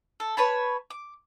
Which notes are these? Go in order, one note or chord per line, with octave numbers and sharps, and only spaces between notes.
A4
B4 C#5 A5 B5
D6